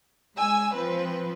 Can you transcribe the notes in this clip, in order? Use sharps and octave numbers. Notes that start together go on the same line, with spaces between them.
G#3 G#5 E6
F3 C4 B4